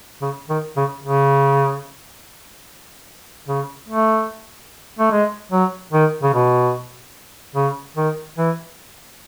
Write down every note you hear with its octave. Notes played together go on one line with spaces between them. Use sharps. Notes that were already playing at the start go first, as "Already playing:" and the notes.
C#3
D#3
C#3
C#3
C#3
A3
A3
G#3
F#3
D#3
C#3
B2
C#3
D#3
E3